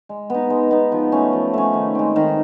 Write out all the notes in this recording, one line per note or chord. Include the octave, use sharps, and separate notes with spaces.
G#3
B3 D#4
G#3
B3 D#4
F3
A3 C#4
F3
A3 C#4
D#3
G#3 C4
D#3